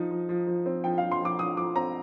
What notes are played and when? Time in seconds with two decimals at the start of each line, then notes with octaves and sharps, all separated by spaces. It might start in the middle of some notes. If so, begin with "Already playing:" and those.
Already playing: F3 D#4
0.11 F3
0.29 F3
0.47 F3
0.66 C4
0.84 F3 G5
0.98 F3 F5
1.12 C6
1.21 F3 D6
1.39 F3 D#6
1.57 F3 D6
1.76 C4 A#5